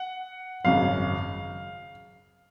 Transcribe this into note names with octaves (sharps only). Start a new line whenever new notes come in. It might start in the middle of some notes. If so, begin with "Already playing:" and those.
Already playing: F#5
G#1 F#2 C#3 F5